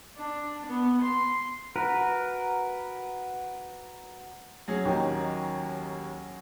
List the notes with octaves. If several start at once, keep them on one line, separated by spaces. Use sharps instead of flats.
D4
B3
C6
F#4 A#4 B4
F#3 C#4 G#4
D#2 D#3 D#4